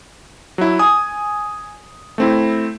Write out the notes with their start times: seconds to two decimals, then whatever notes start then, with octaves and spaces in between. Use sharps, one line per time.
0.58 F#3 E4
0.79 G#5 D#6
2.18 A3 C4 E4